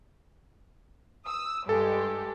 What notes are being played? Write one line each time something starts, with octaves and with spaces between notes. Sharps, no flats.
D#6 E6
G2 G#3 G4 A4